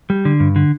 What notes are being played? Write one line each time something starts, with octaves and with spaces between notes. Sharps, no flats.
G3
D3
G2
D3